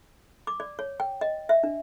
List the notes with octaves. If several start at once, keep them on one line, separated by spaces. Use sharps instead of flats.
D6
D5
C#5
G5
D#5
E5
D4